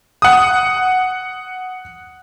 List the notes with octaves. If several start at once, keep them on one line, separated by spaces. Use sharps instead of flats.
F#5 D#6